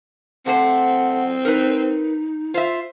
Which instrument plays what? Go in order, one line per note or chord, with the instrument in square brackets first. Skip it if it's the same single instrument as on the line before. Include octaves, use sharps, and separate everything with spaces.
[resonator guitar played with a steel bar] C3 A3 C5 [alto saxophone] C4 [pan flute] F#5
[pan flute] D#4 [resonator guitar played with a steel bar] A#4 B4
[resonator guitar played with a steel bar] F4 E5 [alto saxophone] C5